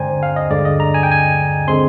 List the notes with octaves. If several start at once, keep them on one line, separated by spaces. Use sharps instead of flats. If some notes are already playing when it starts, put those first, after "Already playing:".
Already playing: G2 D3 G#3 C5 D5 G5 G#5 A#5
F5
D#5
G2 D3 G#3 D5
D#5
A#5
G#5
G5
G#5
D3 G#3 C4 C6